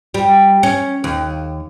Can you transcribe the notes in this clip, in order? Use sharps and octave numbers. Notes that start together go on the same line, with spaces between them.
G3
C#4
D#2